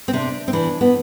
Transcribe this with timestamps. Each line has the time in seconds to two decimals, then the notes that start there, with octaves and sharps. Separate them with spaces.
0.08 C4
0.13 C3 D4
0.48 C4
0.53 E3 D4
0.81 B3